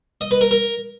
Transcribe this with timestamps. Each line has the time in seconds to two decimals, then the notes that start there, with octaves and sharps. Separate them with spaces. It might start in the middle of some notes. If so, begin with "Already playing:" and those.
0.21 D#5
0.31 B4
0.41 A#4
0.51 A#4